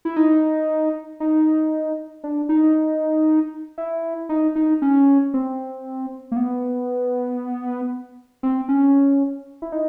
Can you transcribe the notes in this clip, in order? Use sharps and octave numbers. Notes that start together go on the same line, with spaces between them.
E4
D#4
D#4
D4
D#4
E4
D#4
D#4
C#4
C4
A#3
B3
C4
C#4
E4
D#4